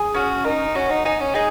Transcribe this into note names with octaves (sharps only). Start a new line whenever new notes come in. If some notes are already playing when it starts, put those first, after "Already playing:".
Already playing: G#4
C#4 F#4
D#4 A#4
C#4 F#4
D#4
D#4 G#5
C#4
D#4 G#4